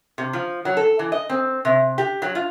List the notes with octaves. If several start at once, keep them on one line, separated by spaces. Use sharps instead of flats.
C3
F3
F#3
A4
E3
D#5
C4
C3
G4
F#3
F4